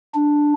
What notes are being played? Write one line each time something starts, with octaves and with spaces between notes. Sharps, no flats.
D4